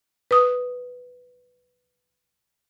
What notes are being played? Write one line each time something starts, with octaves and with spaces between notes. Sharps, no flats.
B4 D#6